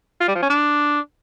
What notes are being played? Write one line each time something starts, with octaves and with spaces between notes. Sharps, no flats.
F4
G3
F3
C#4
D4